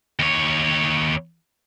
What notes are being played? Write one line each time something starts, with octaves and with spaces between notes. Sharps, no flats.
D#2 C#5